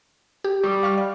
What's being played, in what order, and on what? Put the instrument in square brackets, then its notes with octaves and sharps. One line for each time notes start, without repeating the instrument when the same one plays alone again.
[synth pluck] G4
[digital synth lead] G3 [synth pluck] C#6 D#6
[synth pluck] F5 C#6 F6
D5